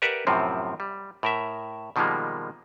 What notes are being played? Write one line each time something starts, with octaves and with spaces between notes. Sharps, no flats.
G4 A#4 B4 D5 E5 F#5
F#2 A2 C3 F3 C4
G3
A2 A#4 E5
B2 D#3 F3 G3 G#3 A#3